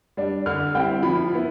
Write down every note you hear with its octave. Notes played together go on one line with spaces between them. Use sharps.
G3 D4
D3 F6
G3 C4 E4 G5
F3 B5
B3 E4